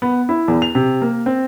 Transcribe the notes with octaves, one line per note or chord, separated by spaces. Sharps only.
B3
E4
E2
F7
C3
A#3
C4